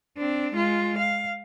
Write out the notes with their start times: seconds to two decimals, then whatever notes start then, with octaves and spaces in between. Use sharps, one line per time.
0.17 C4 D4
0.53 G#3 F4
0.98 F5